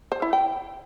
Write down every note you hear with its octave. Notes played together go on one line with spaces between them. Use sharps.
C5
E4
G5